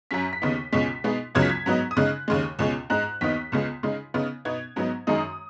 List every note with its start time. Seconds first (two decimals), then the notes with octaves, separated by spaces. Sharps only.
0.11 F#2 F#3 C#4 B6
0.33 B6
0.42 D#2 C#3 B3 D#4
0.72 C#2 B2 G#3 C#4 B6
1.04 B2 G#3 B3 D#4
1.35 C#2 C#3 F#3 B3 D#4 G#6
1.42 B6
1.50 G#6
1.66 G#2 F#3 B3 D#4
1.91 D#6
1.97 C#3 G#3 D#4 F#6
2.28 D#2 C#3 G#3
2.59 C#2 B2 G#3 C#4
2.90 G#2 G#3 D#4 F#6
3.21 D#2 D#3 B3 D#4 B6
3.52 C#2 C#3 G#3 B3
3.83 C#3 G#3 D#4
4.14 C#3 B3 D#4
4.45 B2 B3 D#4 G#6
4.76 G#2 F#3 B3 D#4
5.07 F#2 D#3 G#3 D#4 D#6